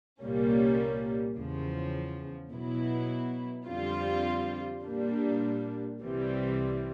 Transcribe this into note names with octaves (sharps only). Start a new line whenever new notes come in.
C2 A#2 G3 A#3 C#4
E2 C#3 F3
B2 F#3 B3 E4
F2 D3 G3 C4 F4
A#2 G3 A#3 D4
C2 C3 E3 G3 C4